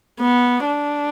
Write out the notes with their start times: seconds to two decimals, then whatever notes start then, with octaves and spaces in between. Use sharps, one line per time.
0.20 B3
0.66 D4